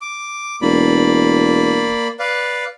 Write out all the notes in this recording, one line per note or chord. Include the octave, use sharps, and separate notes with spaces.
D6
E1 A#3 D5 B5
B4 D5 F5